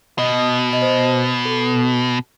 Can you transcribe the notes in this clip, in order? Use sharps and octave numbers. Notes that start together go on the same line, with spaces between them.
B2 D#5
D#5
C5
A4